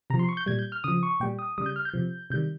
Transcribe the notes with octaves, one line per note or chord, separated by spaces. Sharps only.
C3 F3 A#5
C6
C#6
G6
A#2 G3 G#6
G6
F6
C#3 F3 D#6
C#6
A#2 G3 G5
D#6
C#3 G3 D#6
G6
F6
G6
C3 F3
C3 D#3 G3 G6